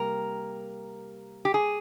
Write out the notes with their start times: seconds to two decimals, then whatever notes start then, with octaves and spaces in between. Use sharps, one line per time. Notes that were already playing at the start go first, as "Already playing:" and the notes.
Already playing: C3 G3 A#3 A#4
1.45 G4
1.54 G#4